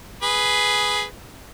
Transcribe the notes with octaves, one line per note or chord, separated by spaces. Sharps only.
G#4 B4